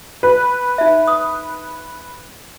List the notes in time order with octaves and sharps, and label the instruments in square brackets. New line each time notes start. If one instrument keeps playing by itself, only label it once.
[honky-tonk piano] B4
[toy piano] D#4 E5
D#6